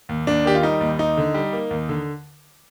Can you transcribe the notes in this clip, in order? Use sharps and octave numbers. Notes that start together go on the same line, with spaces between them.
D#2
D#2 D4
D#3 G4
F4
G3 D#4
D#2
D#2 D#4
D3
G3
A#3
D#2
D3